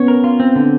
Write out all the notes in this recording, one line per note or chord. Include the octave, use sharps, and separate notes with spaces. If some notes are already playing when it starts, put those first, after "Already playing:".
Already playing: B3 C#4 C#5
A#4
F4
C4
D3